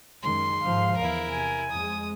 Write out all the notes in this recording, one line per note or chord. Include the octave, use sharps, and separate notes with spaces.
F#2 D#3 G#3 C6
G#2 D3 F3 F5
E2 D3 E4 A#4
C3 G#5
F2 G#3 D#6